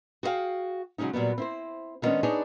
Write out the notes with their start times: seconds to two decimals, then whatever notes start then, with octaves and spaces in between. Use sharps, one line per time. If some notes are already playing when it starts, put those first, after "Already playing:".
0.23 F#4 G#4 C5 F5 G5
0.98 C#3 F#3 G#3 C#4 D#4
1.13 A#2 F#3 G3 B3
1.38 C4 E4 C5
2.02 D3 D#3 G#3 B3 C#4 D4
2.23 D4 D#4 G#4 B4 C#5